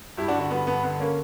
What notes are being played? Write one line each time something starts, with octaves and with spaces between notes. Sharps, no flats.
G2 E4 G4
D4 F#4
D3
D4 F#4
G2 B3
G2 B3
D3 B3
A#3 C#4